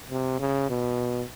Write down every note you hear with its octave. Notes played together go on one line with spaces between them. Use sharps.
C3
C#3
B2